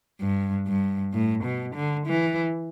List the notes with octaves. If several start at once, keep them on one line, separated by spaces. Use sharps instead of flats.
G2
G2
A2
B2
D3
E3